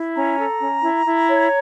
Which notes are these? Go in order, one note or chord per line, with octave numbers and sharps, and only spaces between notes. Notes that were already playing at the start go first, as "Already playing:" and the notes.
Already playing: E4
C#4 A#5
A4
C#4
E4
E4
C#5